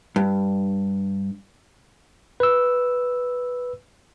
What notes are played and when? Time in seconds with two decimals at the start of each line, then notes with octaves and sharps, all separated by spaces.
0.16 G2
2.40 B4 E6